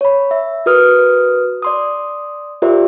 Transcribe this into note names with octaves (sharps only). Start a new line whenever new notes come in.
C#5 B5
E5
F#4 A#4 B4 D#6 F6
D5 C6 D#6
F4 G4 A#4 C5 D5 E5